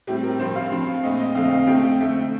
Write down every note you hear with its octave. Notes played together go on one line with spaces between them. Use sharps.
A2 G3 C4 G4
A#4
G2 F3 C4 C5
F5
G2 F3 C4
A#2 A3 C4 D#5
D#5
F2 D3 A3 C4 F5
D#5
F5
F2 C3 F3 A3 G5
D3 A3 C4